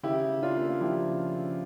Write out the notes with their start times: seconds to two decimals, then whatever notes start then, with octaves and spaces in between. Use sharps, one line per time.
0.03 C#3 E4 G4
0.29 C#3
0.42 D4 F4
0.56 A#3
0.81 F3 E4 G4
1.07 C#3
1.33 C#3